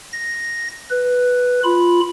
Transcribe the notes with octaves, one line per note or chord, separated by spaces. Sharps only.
A#6
B4
F4 B5